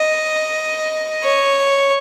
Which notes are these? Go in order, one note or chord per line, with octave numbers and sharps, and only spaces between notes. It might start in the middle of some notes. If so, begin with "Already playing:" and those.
Already playing: D#5
C#5